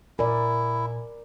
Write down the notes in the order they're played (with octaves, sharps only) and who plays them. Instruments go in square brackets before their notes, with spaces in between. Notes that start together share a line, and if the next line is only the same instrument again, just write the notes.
[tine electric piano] A#2 G#5 [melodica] E4 [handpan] A#4 D5